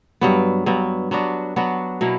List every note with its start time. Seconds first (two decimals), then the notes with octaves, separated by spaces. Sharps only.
0.21 G2 F#3 B3
0.66 G2 F#3 B3
1.11 F#3 B3 D4 F#4
1.56 F#3 B3 D4 F#4
2.01 B2 F#3 A#3 E4